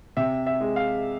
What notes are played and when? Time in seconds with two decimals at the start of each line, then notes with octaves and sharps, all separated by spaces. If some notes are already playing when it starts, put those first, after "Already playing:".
0.17 C3 E5
0.47 E5
0.61 G#3
0.76 F5